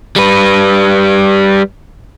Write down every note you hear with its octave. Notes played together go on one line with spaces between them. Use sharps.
G3 B4